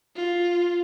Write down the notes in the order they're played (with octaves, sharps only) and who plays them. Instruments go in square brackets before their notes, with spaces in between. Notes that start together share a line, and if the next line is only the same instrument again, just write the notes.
[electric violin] F4